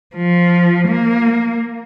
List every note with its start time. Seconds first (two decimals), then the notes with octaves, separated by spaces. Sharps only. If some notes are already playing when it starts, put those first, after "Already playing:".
0.16 F3
0.88 A#3